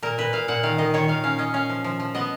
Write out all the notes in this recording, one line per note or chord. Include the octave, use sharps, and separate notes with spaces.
A#2 A#4
A#2 B4
A#2 F5
A#2 F#5
D#3 F5
D#3 D#5
D#3 C#5
D#3 F5
C#4 F5
C#4 D#5
C#4 F5
F3
F3
F3
B3 D#5